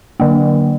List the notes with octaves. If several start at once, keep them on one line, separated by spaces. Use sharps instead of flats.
D3 F#3 A#3